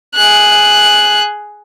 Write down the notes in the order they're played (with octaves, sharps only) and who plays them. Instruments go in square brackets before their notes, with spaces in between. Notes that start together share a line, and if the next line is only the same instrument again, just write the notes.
[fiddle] G#4 F#6